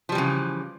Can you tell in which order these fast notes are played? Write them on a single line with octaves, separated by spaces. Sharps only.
F3 G3 E3 C#3